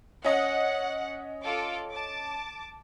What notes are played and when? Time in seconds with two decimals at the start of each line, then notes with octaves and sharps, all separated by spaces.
0.24 C#4 D#5 F#5
1.43 F4 A4 D6
1.92 A5 D6